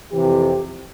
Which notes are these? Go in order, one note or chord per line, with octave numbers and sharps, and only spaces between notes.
F2 C3 E3 G4